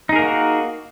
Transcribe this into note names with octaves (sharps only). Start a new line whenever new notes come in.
A#3 D#4 F#4 G#4 A#4